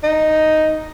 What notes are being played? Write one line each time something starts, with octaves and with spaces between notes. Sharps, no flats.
D#4